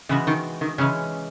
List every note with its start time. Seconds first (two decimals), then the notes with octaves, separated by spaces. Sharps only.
0.09 C#3 E3 G#3 B3 F#4
0.27 D#3
0.61 D#3
0.78 C#3 E3 G#3 C#4